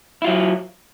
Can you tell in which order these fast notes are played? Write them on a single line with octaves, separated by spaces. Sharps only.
E4 F4 F#3